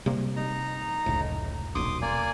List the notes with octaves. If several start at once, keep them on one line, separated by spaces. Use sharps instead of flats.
C3 G3 A#3
D#4 A#5
F1 C#2 A2
D#1 B1 C6 D6 D#6
A#3 D5 G#5